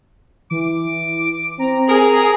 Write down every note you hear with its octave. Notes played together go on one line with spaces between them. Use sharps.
E3 D6
C4 A#5
G#4 A#4